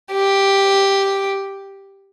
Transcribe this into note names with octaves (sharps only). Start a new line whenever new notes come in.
G4